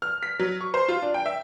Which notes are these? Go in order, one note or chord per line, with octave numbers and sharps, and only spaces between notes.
F6
B6
F#3
C#6
C5
F4
D4
G5
E5